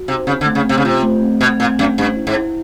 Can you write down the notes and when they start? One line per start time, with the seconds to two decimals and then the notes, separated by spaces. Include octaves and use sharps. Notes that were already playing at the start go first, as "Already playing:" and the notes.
Already playing: F#4
0.08 C3 D#4
0.27 C#3 C4
0.41 D3
0.45 A3
0.55 C#3
0.65 C3 C4
0.78 C#3
0.84 C3 F4
1.03 A3
1.22 C4
1.40 B2 A3
1.60 A#2 C4
1.78 F#2 A3
1.98 G2 C#4
2.16 E4
2.27 G#2
2.36 E4